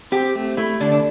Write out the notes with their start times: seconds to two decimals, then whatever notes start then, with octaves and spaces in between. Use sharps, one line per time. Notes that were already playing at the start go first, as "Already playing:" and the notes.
0.12 C4 G4
0.35 A3
0.57 A3 E4
0.80 D3 D4
0.92 D4